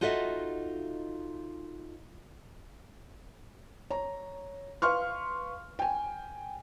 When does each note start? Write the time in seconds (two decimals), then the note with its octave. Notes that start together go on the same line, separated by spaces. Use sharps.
0.01 D#4 F4 F#4 A4 D#5 E5
3.90 C#5 A#5
4.82 B4 F5 C6 C#6 F6
5.79 G5 G#5